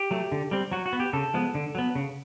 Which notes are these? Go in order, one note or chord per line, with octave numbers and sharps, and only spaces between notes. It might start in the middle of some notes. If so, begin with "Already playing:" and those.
Already playing: G4
F#3 A3
D3
G3 C4
F#3 F#4
F#4
B3
G4
C#3 A4
F3 G#3 B3
D3
F#3 B3
C#3